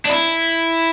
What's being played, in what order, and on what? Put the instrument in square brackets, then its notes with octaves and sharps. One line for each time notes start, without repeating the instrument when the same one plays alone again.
[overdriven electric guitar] D4
E4